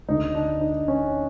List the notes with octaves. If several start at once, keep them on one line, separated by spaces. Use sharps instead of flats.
D2 D3 D#4
D4
D#4
C#4